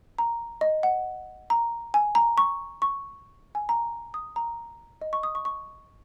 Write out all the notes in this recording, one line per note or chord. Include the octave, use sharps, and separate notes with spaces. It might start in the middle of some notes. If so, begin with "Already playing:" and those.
A#5
D#5
F#5
A#5
G#5
A#5
C#6
C#6
G#5
A#5
D#6
A#5
D#5
C#6
D#6
C#6
C#6